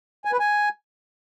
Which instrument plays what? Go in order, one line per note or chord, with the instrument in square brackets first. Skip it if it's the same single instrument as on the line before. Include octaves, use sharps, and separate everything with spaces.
[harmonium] G#5
B4
G#5